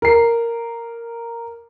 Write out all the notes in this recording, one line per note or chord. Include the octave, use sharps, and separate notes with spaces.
A#4 C7